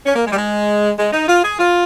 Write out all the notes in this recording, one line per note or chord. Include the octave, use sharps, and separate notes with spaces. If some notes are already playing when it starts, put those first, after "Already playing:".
C#4
A#3
G#3
G3
G#3
G#3
D#4
F4
G#4
F4